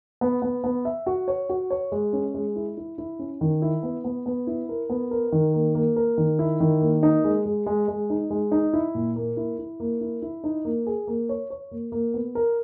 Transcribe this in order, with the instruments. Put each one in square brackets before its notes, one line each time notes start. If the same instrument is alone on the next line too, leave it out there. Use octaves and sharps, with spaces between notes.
[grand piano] B3
B3
B3
E5
F#4
C#5
F#4
C#5
G#3
C#4
G#3
E4
E4
E4
C#4
D#3
E4
B3
B3
B3
E4
A#4
B3
A#4
D#3
A#3
A#3
A#4
D#3
E4
D#3
A#3
D#4
G#3
G#3
G#3
G#3
D#4
G#3
D#4
E4
A#2
A#3
E4
E4
A#3
E4
E4
D#4
A#3
G#4
A#3
C#5
C#5
A#3
A#3
B3
A#4